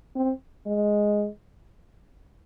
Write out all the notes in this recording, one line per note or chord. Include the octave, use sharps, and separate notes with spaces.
C4
G#3